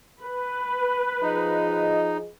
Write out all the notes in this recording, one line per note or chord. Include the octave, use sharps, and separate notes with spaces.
B4
F3 D#4 G#4 D#5